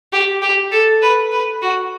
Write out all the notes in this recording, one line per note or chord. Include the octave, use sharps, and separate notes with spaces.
G4
G4
A4
B4
B4
F#4